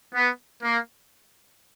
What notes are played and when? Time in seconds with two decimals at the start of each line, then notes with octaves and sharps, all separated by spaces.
0.15 B3
0.63 A#3